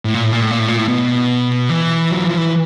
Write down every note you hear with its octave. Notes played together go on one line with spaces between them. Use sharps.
A2
A#2
A2
A#2
A2
A#2
A2
A#2
A2
B2
E3
F#3
F3
E3